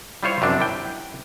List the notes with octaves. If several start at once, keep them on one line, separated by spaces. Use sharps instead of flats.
G3 E4 F4 C5 C#5
F#2 C3 F3 D4
E4 G5